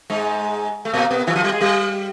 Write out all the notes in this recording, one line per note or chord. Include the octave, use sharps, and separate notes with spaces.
G#2 G#3
A3
A#2 A#3
B2 B3
E3 E4
F3 F4
G3 G4
G#3 G#4
G3 G4